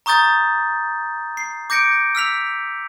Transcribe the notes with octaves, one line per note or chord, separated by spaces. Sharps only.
A#5 C#6 D#6 G6 A6
C7
D6 G6 A#6 C#7 D7
E6 F6 B6 F7